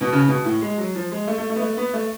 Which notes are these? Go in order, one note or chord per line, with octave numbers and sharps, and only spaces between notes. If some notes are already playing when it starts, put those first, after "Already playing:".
B2
C#3
B2
A2
G#3
F#3
F3
G#3
A3
A3
A3
B3
A3
B3
A3